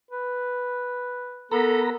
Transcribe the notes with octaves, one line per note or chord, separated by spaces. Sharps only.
B4
B3 A4 A#4 A#5 B5